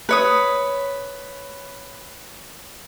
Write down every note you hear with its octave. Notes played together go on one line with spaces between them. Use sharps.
B4 C#5 D#6